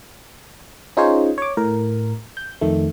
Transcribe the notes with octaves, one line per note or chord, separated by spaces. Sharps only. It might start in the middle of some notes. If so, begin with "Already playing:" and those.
C#4 D#4 F4 G#4 C5 C#5
C#5 D6
A2 A#4
G6
F2 D#3 A3